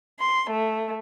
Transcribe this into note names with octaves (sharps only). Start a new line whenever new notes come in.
C6
A3